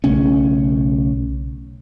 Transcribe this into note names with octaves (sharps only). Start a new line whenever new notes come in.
B1 C#3 A3 C#4